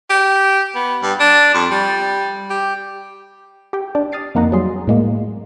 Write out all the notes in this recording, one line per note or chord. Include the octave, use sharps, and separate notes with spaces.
G4
B3
G2
D4
F2
G3
G4
G4 G5
D4 D5
D#6 F6 A6 C7 D7
F2 A#3 D#4 F#5 A#5
F#3 G3 G#4 C6
A2 G#3 A#3